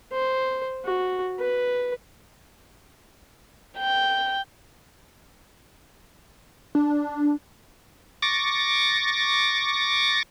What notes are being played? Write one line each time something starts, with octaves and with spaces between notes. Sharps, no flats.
C5
F#4
B4
G5
D4
C#6 D6 A6 A#6